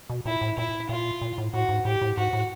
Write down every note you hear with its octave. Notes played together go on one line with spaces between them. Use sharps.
B2
A#2 E4
A2
A#2 E4
A#2 F4
A#2
A2
A2 F#4
G#2
A2 G4
A2
G#2 F#4
A2